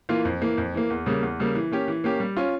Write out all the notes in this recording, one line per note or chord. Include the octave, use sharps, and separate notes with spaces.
E3 A#3 F4
F2
E3 A#3
F2
E3 A#3
E2
C#3 G3 A#3
E2
C#3 G3 A#3
E3
A#3 C#4 G4
E3
A#3 C#4 G4
G3
C#4 F4